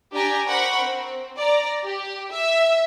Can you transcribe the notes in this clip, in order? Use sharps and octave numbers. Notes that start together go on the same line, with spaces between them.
D4 G4 D5 G5 G#5 A#5
A#4 C5 F#5 B5 C#6
C4
D5 A#5
G4
E5